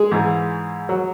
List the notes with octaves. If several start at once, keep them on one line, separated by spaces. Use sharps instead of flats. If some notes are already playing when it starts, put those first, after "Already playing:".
Already playing: G#3 G#4
G#2 E3
F#3